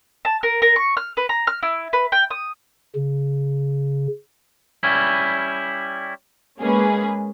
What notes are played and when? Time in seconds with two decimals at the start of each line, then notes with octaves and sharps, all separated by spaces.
0.25 A5
0.43 A#4
0.62 A#4
0.76 C#6
0.97 F6
1.17 B4
1.29 A#5
1.47 F6
1.63 E4
1.93 B4
2.12 G5
2.30 D#6
2.95 C#3
4.83 G3 C#4 E4
6.61 G#3 A#3 C#4 G#4 B4